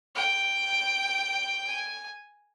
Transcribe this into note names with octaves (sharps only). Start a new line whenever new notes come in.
G5
G#5